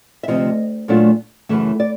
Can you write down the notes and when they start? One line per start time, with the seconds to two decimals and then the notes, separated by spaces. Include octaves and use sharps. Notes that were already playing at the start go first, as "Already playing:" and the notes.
0.23 E5
0.28 D2 C3 F3 D#5
0.88 A#2 F#3 A3 D4 F4
1.49 F#2 C#3 E3 A3 E5
1.80 D5